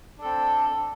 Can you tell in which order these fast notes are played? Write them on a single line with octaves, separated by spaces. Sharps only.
D4 A4 C4